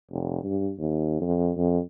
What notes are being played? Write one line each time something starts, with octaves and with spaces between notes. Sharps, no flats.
F1
G2
D#2
F2
F2